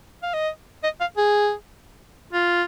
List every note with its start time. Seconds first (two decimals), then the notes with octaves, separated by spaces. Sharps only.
0.23 F5
0.34 D#5
0.83 D#5
1.00 F5
1.17 G#4
2.33 F4